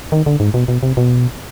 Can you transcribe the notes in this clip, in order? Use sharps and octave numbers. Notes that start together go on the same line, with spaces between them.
D#3
D3
G#2
B2
B2
C3
B2